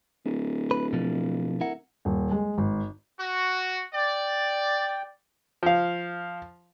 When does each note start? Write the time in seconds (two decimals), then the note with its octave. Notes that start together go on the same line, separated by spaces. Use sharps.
0.25 D1
0.71 B4
0.93 B2 F3
1.61 E4 A#4 F#5
2.05 D#1
2.31 G#3
2.58 G#1
3.18 F#4
3.94 D5 G5
5.63 F3 F5